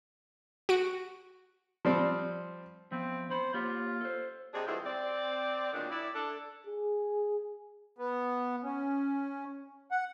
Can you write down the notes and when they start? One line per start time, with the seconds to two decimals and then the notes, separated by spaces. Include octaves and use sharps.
0.69 F#4 D7
1.85 F3 G3 C4
2.92 F3 B3 C4
3.30 C4 C5 B5
3.54 A#3 F4 G4 C#5
4.01 A4 C5
4.54 C3 G3 D4 D#4 G#4
4.67 G2 D3 F3 G#3 C4 E4
4.85 C4 D5
5.73 E2 A#2 D#3 F#3 D4
5.90 E4 D5
6.15 D4 A4
6.66 G#4
7.98 B3
8.63 C#4
9.91 F#5